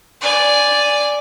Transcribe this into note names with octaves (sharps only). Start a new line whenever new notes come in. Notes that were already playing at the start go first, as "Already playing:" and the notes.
D5 G#5